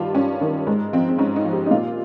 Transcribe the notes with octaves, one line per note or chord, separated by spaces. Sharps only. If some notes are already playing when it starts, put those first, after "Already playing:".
Already playing: G2 D#3 F4 G4
G2 C#4
D#3
G#2 G#3
F3 C4
C4
G#2 C#4
D#4
F3
G4
D#4
A#2 F4